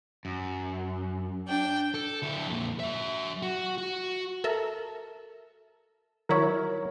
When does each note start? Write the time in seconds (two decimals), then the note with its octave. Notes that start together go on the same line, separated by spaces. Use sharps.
0.25 F#2
1.47 D4 G5
1.94 A4
2.22 D3 E4
2.48 F2 A#2
2.80 F#3 E5
3.42 F#4
3.78 F#4
4.44 A4 A#4 E5
6.29 D#3 F#3 E4 A#4 C#5